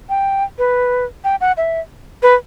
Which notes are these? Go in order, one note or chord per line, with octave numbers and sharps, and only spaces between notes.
G5
B4
G5
F#5
E5
B4